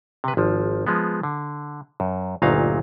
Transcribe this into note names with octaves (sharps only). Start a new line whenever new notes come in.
C3 B4
G#1 F3
F3 G#3 B3
D3
F#2
G1 D2 A#2 F#3 D#4 F5